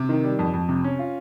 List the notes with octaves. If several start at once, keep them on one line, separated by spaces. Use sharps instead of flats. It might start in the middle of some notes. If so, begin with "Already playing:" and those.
Already playing: C3
D#3
G3
F2
F2
C3
C#4
F4